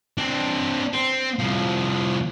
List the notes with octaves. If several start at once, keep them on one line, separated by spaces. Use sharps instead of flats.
C4 D4
C4
C2 F3